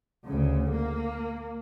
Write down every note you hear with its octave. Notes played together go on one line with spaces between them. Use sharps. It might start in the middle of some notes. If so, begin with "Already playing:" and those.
D2 C#3
A#3